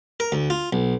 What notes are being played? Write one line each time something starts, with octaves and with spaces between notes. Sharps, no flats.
A#4
D2
F4
B1